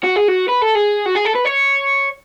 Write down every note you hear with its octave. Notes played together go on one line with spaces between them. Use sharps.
F#4
G#4
F#4
B4
A4
G#4
F#4
G#4
A4
B4
C#5